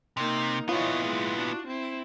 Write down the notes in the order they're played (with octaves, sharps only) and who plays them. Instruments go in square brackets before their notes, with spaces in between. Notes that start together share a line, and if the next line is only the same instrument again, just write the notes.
[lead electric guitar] C3 [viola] A#3 D#4
[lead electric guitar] A#2 B3 [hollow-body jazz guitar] E4 F4 [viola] C#5 D#5
[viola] G#3
D4 F#4
C4 E4